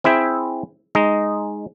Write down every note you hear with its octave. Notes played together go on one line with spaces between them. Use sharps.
C4 E4 G#4 E5 G5
G#3 D#4 D#5